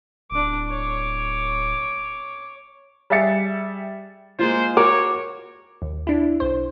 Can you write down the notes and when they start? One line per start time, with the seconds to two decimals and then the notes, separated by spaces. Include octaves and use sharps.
0.31 D1 D4 D6
0.70 C#5 D6
3.10 G3 G#4 E5 A6 C#7
4.39 G#3 A#3 F4 C5
4.77 F#4 A#4 C#5 D6
5.82 D#2
6.07 D4 E4
6.40 B1 C5